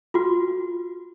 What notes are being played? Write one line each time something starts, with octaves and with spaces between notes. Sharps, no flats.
F4 F#4